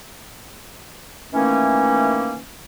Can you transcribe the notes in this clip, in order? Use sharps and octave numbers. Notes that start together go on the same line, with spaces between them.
D#3 E3 A3 A#3 C#4